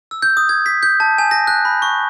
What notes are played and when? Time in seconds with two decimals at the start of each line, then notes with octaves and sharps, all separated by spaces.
0.11 E6
0.22 G6
0.37 D#6
0.49 G#6
0.66 B6
0.83 G6
1.00 A5
1.18 G#5
1.31 A#6
1.47 F#6
1.65 B5
1.82 C#6